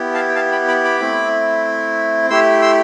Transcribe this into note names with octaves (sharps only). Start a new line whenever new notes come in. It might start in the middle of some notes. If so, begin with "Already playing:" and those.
Already playing: B3 E4 G4
F5 A5
G5
F5 A5
G5 B5
B5 D6
B5 D6
A3 C4 E4
A3 E4 G4 C6 E6
C6 E6